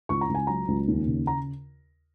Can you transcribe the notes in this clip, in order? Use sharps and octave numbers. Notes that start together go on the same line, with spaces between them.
C#2 C#6
A#5
C#2
G#5
F#3 A#5
C#2
D#2
C#3
A#5